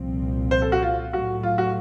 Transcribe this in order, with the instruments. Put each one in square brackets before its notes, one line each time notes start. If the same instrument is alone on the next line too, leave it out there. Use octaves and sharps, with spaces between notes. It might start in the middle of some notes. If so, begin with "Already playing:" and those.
Already playing: [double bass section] C2 A#2 F3 C4
[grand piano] C5
A4
F#4
F4
[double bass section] A2 F#3 A3 [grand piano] F#4
[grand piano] F4
F#4